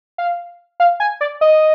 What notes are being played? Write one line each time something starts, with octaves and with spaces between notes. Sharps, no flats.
F5
F5
G#5
D5
D#5